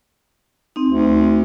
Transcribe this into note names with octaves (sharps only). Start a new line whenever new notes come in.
C4 D#4
D2